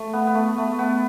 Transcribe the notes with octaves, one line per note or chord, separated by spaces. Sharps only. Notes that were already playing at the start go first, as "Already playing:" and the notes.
Already playing: A3
B3
B3
A3
A3
B3